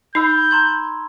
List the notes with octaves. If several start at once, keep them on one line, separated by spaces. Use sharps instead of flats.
D#4 B5 E6 G6
A#5 C6 G#6